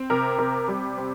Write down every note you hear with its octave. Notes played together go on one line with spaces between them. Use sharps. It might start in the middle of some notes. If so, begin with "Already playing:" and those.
Already playing: C4
C3 A#4
C3 A#4
G3
C4